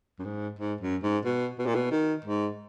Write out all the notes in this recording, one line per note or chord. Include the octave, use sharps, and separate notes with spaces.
F#2
G#2
G#2
F#2
G#2
B2
B2
A#2
B2
D#3
G#2